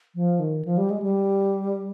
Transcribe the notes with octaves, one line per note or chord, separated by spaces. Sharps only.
F3
D#3
F3
G3
G#3
G3